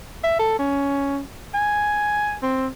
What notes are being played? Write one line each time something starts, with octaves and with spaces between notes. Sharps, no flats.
E5
A4
C#4
G#5
C4